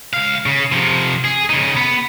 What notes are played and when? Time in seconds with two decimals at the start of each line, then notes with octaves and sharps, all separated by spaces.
0.13 C#2 F5
0.46 C#3
0.72 C3 F3
1.24 G#4
1.50 C#3 D#4
1.77 B3